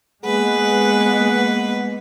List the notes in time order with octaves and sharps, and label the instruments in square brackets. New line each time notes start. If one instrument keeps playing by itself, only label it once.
[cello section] G#3 A#3 B3 [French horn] G#4 [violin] B4 [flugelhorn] F#5